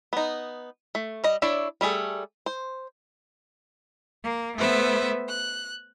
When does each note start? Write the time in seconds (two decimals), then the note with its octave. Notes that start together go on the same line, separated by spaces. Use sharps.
0.13 B3 D#4
0.95 A3
1.24 G3 D#5
1.42 D4 E4 C#5 D5
1.81 G3 A3 G#4 A4
2.46 C5
4.22 A#3
4.56 A3 B3 B4 C5 E5
5.27 F#6